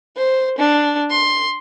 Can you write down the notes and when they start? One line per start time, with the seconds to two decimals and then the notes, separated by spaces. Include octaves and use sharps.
0.16 C5
0.59 D4
1.10 C6